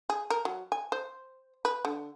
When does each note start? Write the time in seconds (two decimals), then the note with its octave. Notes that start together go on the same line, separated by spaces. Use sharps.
0.10 G#4
0.30 A#4
0.45 F#3
0.72 G#5
0.92 C5
1.65 B4
1.85 D3